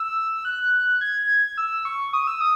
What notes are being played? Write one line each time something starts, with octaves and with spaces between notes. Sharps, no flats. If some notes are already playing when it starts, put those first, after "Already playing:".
Already playing: E6
E6
F#6
G#6
E6
C#6
D#6
E6
D#6